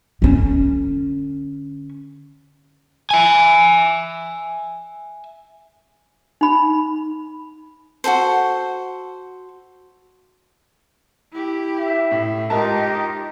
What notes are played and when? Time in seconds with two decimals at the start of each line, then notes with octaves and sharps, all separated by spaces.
0.22 D3 C#4
3.11 E5 G#5
6.41 D#4 B5
8.04 F#4 G#4 A4 C5
11.32 E4 G4
11.80 E5
12.11 A2
12.50 G#2 D#4 F4 G4 A#4 A5
12.87 D#5